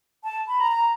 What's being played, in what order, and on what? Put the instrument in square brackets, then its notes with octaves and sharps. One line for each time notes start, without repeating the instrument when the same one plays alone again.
[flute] A5
B5
A#5
A#5